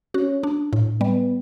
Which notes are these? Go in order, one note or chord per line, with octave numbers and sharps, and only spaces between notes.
C#4 F#4
D4
A2
G3 B3